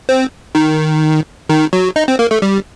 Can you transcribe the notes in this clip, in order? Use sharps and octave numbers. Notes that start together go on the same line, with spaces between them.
C4
D#3
D#3
F#3
D#4
C4
A#3
A3
G3